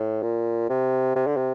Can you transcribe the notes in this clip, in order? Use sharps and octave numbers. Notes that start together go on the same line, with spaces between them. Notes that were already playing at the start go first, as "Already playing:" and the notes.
Already playing: A2
A#2
C3
C3
D3
C3